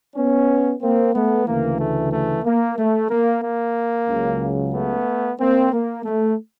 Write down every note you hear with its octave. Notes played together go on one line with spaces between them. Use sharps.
B3 C#4
A#3 C4
A3 B3
D2 C#3 E3 A#3
A3
A3
A#3
A3
A#3
A#3
C#2 C#3 F#3
A3 B3
A#3 C4
A#3
A3